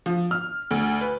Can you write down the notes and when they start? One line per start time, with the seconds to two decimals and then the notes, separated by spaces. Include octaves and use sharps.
0.06 F3
0.31 F6
0.71 D2
1.01 B4